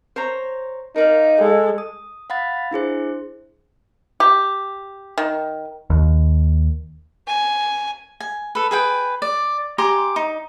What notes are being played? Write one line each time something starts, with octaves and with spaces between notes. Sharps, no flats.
C5 C#5 A#5
D#4 A#4 D5 F5
G#3 A4
D#6
F5 F#5 B5 A6
D4 E4 G#4 C5
G4
D#3
D#2
G#5
G#5
A4 B4
G#4 B4 G5
D5
G4 G#5 A#5 C6
D#4